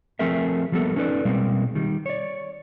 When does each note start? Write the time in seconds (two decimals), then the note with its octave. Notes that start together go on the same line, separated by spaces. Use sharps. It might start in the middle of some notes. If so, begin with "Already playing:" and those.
0.19 F3 A3 C4 G#4 A#4 E5
0.72 F3 G3 A#3 B3 A4
0.96 C#4 D#4 A4 B4 D5
1.25 B2 G3 G#3 A#3 C4
1.75 D#3 G3
2.06 C#5 D5